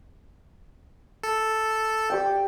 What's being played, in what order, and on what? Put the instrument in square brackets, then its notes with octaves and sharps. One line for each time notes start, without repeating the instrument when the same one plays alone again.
[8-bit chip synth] A4
[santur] G4 D5 G5